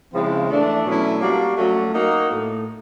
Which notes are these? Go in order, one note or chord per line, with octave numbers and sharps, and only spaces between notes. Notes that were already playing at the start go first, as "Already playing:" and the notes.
C#3 F3 G#3 C4 E4
E3 A3 D4
B2 F#3 A3 C#4 E4
G3 A#3 D4 F#4
F#3 A3 C#4 F#4
A#3 D#4 F#4
A2